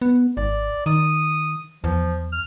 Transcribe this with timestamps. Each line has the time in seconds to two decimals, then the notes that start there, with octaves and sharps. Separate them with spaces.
0.02 B3
0.37 G#1 D5
0.86 D#3 D#6
1.84 E2 F3
2.32 F6